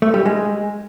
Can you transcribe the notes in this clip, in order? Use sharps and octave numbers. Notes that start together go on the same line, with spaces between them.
A3
G3
G#3